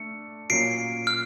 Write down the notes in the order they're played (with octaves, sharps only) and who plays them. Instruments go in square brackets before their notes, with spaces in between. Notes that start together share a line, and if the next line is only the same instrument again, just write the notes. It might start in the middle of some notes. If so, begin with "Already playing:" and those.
Already playing: [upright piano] A3 D4 [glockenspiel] C#7
[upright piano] A#2 F#3 A#3 C#4 [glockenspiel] C7 D7
[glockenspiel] F6